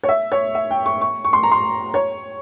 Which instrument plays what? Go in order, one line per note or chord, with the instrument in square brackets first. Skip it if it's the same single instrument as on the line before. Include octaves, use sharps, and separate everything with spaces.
[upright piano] C#5
E5
C#5
E5
G5
C#6
C#6
C#6
C6
A#5
C6
C#5